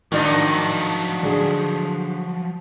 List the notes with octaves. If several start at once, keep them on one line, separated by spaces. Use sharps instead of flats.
G#2 D#3 F3 F#3 D4 D#4
D3 G#4